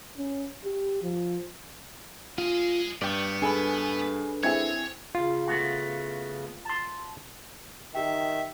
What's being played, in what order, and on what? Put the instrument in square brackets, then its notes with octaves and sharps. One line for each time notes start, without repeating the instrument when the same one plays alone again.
[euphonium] C#4
G4
F3
[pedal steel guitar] F4 [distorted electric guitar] G#4 D#5
[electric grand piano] G2 [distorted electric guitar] B3 [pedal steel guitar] D5 G5 C#6
[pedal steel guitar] D4 A4 B4 [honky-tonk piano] G#4 G#5 B5
[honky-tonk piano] C4 E4 G#4 [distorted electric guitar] C#5 [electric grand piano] G#6
[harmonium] C#3 [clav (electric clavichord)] F4
[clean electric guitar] A3 B3 F#4
A5 C6
[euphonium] D#3 [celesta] G4 G5 [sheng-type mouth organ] E5